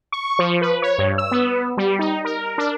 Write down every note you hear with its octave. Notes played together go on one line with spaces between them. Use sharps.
C#6
F3
B4
C#5
G2
E6
B3
G3
D#4
A#4
D4